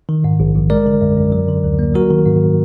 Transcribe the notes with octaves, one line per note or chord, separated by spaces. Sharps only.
D#3
G#2
A#1
A#1
G#3 A#4 D5
D3
F#2
F#2
F#3
D3
D2
A#3
F#3 F#4 A#4
D#3
G#2